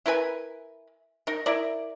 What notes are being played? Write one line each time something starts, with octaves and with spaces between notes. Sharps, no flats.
E4 A#4 B4 G#5
D#4 A#4
E4 A#4 D5